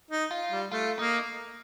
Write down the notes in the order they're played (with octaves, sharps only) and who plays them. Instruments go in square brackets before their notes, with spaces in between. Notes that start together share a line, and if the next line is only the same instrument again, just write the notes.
[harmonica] D#4
[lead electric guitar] F4
[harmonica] G3
[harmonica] A3 [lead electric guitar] F4
[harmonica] A#3 [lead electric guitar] D#4